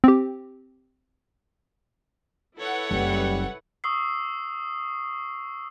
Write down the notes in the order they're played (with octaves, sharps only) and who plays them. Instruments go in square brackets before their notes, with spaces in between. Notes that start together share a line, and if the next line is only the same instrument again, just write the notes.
[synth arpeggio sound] C4 G4
[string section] E4 B4 F#5 [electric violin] A4 C#5
[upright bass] F#1 [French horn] G3
[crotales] C#6 D#6 E6 C7